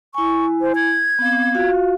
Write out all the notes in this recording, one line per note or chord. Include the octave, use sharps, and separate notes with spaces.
E4 G#5 C#6
C5
G#6
B3 C4 F5
F4 F#4 F5